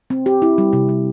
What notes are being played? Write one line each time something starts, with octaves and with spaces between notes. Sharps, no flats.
C4
G4
E4
G3
C3
G3